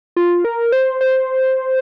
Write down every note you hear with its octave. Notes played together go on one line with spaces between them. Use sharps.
F4
A#4
C5
C5